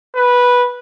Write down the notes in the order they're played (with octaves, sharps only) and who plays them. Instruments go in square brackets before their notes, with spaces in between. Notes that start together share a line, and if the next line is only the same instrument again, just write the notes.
[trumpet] B4